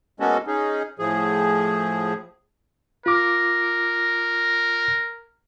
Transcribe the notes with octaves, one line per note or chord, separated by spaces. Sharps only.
G#3 A#3 B3 C#4 F#4 A4
C#4 D#4 G#4
A2 F3 G#4
F4 A#4 D6